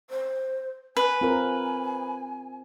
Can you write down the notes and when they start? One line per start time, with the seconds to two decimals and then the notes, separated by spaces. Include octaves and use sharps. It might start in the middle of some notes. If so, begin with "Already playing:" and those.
0.10 C5
0.97 B4 G#5
1.21 C4 F4 A#4